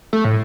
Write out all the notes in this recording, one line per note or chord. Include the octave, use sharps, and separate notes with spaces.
A3
A2